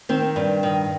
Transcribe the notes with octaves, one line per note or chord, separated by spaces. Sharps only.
D#3 C4
G2
D#3